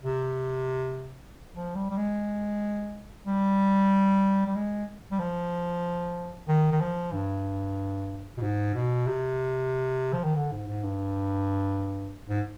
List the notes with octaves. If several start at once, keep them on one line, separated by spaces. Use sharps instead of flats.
C3
F3
G3
G3
G#3
G3
G3
G#3
G3
F3
D#3
D#3
F3
G2
B2
G#2
B2
C3
F3
D#3
D3
G#2
G#2
G2
G#2